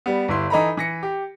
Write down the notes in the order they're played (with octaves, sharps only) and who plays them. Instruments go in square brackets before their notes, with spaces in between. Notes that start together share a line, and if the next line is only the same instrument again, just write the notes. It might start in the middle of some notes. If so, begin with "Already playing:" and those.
[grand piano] G3 B3
G1 G2 E4 C6
E3 D#4 A4 A#5 B5
E3 A#6 C#7
G4